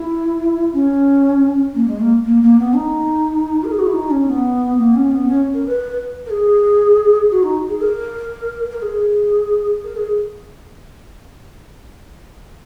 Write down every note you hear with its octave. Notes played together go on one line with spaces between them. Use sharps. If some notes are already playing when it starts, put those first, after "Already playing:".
Already playing: E4
C#4
A#3
G#3
A#3
A#3
A#3
B3
D#4
A#4
G#4
F#4
E4
D#4
C#4
B3
A#3
C#4
B3
C#4
A#4
B4
A#4
G#4
F#4
D#4
G#4
A#4
A#4
G#4
A#4
G#4